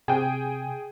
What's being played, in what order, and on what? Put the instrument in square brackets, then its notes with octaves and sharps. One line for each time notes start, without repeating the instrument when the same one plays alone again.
[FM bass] C3 [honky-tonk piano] G#4 G5